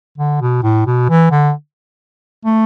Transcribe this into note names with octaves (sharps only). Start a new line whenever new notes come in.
D3
B2
A2
B2
E3
D3
A3